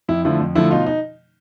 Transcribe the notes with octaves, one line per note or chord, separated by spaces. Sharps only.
F2 E4
D3 F3 A3 E4
F2
D3 F3 A3 E4
B2 D#4 F4
D#4